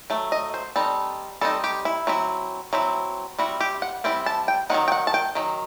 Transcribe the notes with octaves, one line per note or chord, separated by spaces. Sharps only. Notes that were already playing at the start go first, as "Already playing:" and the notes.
F#3 A3
D#5
C5
G3 C4 D#4 A4
G3 C4 D#4 A4
G4
E4
F#3 C4 E4
F#3 C4 E4
G3 C4 E4 F#4
G4
F#5
G3 C4 E4 G5
A5
G5
D#3 F#3 C4 D#4 F#5
G5
F#5
A5
G5
D#3 F#3